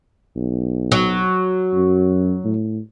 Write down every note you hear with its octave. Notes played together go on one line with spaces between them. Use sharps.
B1
F#3
F#2
A2